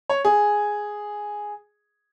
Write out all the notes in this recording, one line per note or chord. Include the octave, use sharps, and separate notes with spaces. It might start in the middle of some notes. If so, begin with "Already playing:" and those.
C#5
G#4